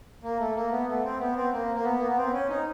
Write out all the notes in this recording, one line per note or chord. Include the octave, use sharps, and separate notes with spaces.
A#3
A3
A#3
B3
A3
C4
B3
C4
A#3
A#3
B3
A#3
B3
C4
C#4
D#4